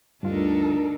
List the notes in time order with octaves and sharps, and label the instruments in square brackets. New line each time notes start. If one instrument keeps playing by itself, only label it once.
[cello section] D2 A4 A#4 [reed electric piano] G2 F4 [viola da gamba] D4 D#4